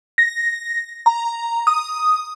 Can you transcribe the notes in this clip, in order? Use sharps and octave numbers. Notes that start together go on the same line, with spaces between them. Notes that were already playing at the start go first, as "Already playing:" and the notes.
A#6
A#5
D#6